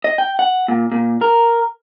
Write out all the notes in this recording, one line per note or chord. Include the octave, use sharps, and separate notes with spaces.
D#5
G5
F#5
A#2
A#2
A#4